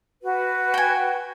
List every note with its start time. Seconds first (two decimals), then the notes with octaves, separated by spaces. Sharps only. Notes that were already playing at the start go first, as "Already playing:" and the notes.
0.21 F#4 B4
0.74 G5 G#5